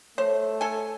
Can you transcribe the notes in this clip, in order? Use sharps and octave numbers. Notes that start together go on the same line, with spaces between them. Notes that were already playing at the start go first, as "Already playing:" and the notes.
A3 C5 C#5
A4 G#5